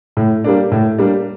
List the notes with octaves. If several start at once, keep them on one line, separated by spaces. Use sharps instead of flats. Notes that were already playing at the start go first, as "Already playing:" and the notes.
A2
G3 A#3 D4
A2
G3 A#3 D4